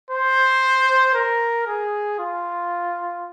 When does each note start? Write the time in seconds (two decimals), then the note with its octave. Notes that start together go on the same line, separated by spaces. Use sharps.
0.10 C5
1.14 A#4
1.67 G#4
2.19 F4